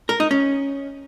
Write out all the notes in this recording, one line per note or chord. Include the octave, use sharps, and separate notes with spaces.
A#4
D#4
C#4